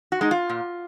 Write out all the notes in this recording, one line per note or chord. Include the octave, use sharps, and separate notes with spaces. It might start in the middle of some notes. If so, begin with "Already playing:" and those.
F#4
G#3 D#4
F4
A#2